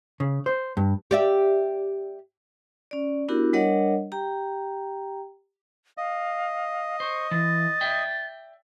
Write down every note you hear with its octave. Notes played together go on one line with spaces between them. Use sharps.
C#3
C5
G2
G4 D5 E5
C#4 D5
B3 D4 E4 F#4 G4 A#4
G3 D4 A#4 C#5 D#5 F#5
G4 G5 A#5
D#5 F5
C5 C#6
E3 A6
D5 E5 G5